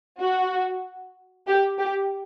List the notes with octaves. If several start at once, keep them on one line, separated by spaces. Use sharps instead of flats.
F#4
G4
G4